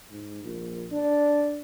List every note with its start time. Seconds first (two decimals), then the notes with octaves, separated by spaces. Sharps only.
0.11 G#2
0.44 A#1
0.92 D4